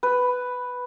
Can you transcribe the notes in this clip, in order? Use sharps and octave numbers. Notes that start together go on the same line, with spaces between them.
B4